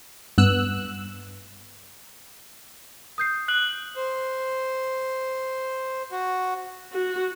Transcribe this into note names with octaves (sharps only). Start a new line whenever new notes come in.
G2 B3 E6 F#6
D#6 G6 C7
F#6 F#7
C5
F#4
F#4